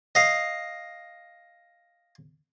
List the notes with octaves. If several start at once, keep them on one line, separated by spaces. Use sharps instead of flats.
D#5 F5